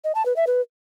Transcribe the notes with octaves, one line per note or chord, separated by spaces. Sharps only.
D#5
A5
B4
E5
B4